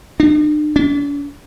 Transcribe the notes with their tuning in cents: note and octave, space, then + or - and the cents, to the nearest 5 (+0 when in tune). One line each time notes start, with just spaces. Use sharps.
D4 +45
D4 -45